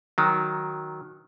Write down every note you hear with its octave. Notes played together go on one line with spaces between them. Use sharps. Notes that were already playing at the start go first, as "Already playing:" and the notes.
D#3 F#3